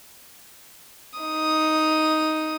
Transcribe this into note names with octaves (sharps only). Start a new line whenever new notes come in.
D#4 D#6